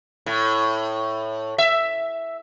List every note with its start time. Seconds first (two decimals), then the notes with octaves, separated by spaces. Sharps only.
0.26 A2
1.58 E5